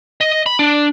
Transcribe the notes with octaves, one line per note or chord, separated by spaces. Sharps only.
D#5
B5
D4